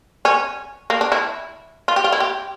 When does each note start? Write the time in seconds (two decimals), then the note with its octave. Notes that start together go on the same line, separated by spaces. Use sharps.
0.25 C#4
0.90 A#3
1.01 D4
1.12 E4
1.88 F4
1.96 G4
2.04 F4
2.12 E4
2.20 G4